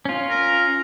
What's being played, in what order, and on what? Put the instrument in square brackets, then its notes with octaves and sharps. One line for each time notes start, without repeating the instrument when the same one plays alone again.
[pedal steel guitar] C#4 F4
[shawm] A#4